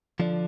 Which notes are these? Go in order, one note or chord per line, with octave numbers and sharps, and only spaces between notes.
D3 F3 D4